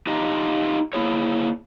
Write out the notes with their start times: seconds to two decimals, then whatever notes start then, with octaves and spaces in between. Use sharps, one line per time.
0.07 D4 D#4 F4 G4 D#5
0.93 A#3 E4 G#4 C#5